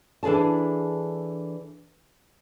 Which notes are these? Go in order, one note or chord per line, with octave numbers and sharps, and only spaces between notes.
E3 D4 G#4 A4 A5